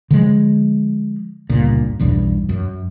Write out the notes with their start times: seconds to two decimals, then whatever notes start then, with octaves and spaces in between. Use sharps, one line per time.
0.11 D3 F3 G#3
1.49 G1 C#2 A#2
2.00 B1 E2 G2
2.49 F#2